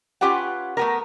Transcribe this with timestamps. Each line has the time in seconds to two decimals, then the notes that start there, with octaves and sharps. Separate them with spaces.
0.21 C#4 F4 G4 B4 F#5
0.77 A3 B3 A#4